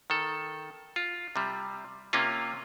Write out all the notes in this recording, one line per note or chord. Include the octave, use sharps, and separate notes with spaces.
D#3 A4
F4
C3 G3
C3 A#3 C#4 F4